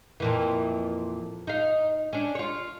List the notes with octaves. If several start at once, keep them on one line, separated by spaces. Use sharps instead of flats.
F2 A#2 E3
D#4 F5
C#4 D4
F4 C#5